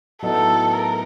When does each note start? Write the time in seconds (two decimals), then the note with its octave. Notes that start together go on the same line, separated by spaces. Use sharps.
0.22 A2 F#3 B3 D#4 F#4 A4
0.73 A#4